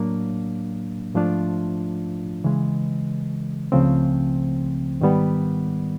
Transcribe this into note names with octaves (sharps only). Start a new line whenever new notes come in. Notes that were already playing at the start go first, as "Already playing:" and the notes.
Already playing: A2 F#3 A#3 D4
G#2 F3 A3 D4 F4
C#3 E3 G#3
C#2 C#3 F3 A3 C4
G#2 D#3 G3 B3